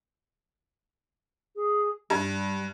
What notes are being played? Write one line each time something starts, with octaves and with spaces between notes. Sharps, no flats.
G#4
G2 G3